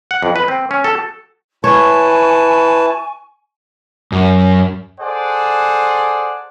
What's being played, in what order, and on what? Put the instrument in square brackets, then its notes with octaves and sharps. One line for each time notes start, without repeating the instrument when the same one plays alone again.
[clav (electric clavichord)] F#5
F2
B4
C4
C#4
A4
[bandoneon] E4 B4 A5 [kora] C#5 [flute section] G#5 C#6
[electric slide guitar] F#2
[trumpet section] G#4 A4 C5 D5 F#5